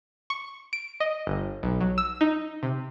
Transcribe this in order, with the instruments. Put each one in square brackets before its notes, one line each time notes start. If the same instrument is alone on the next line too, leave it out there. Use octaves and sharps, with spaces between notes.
[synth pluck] C#6
D7
D#5
G1
B1
F#3
E6
D#4
C3